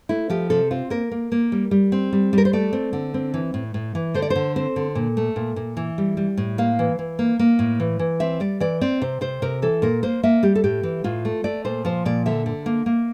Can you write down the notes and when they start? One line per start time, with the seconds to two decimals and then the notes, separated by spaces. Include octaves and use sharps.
0.09 A3 E4
0.30 F3 G4
0.50 C3 A4
0.71 C4 F4
0.90 A#3 A#4
1.12 A#3
1.32 A#3
1.52 G3
1.71 G3
1.92 C4
2.13 G3
2.33 G3 A#4
2.45 C5
2.53 A3 D5
2.73 C4
2.93 D3
3.14 C4
3.34 E3
3.54 A2
3.74 A2
3.95 E3
4.14 D3 C5
4.22 D5
4.30 C5
4.36 D3
4.56 C4 C5
4.76 D3
4.95 A#2
5.17 A3
5.36 A#2
5.56 A#2
5.77 E3
5.98 G3
6.17 G3
6.37 A2
6.58 A#3 F5
6.79 E3
6.99 E3
7.19 A#3
7.39 A#3
7.59 A2
7.80 E3
7.99 E3
8.20 C4 E5
8.40 G3 D5
8.60 E3 D5
8.81 C4 D5
9.02 C3 C5
9.21 C3 C5
9.42 C3 A#4
9.62 E3 A4
9.82 A#2 A#4
10.03 A#3 C5
10.23 A#3 E5
10.43 G3 G4
10.55 A4
10.64 A2 G4
10.83 E3
11.04 A2 F4
11.25 A3
11.44 A3 D5
11.65 A#2 C5
11.85 F3 C5
12.05 A#2 D5
12.26 D3 E5
12.46 D3
12.66 A#3
12.86 A#3